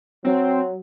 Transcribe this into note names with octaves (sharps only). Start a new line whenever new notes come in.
F#3 C4